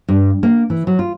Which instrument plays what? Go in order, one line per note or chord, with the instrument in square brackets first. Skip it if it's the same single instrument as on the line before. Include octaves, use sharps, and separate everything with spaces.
[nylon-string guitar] G2
A#3
E3
F#3
F4